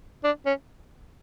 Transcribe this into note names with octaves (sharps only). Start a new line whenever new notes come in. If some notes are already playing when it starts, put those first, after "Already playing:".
D4
C#4